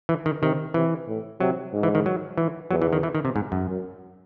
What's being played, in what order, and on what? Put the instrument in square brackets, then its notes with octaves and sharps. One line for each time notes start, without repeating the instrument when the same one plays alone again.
[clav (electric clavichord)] E3
D#3
[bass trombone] C3 [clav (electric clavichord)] D#3
[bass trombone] C3 [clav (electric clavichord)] E3
[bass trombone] A2
[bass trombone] C3 [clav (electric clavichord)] F#3
[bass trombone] G#2
[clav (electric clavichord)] E3
D#3
F#3
E3
[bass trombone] E2 [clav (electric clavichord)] F#3
[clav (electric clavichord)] E3
D#3
E3
D#3
C3
G#2
F#2
[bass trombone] F#2